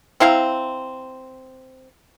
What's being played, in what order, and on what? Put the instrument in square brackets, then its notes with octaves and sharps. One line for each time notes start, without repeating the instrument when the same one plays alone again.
[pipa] C4 E4 F5 A#5